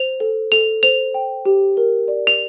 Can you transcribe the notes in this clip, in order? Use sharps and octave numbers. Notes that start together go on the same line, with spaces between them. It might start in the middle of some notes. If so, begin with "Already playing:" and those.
Already playing: C5 F7
A4
A4 F7
C5 F7
G5
G4
A#4
D5
F7